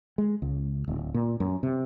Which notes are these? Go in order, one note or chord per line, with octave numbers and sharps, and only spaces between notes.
G#3
C#2
D1
A#2
F#2
C3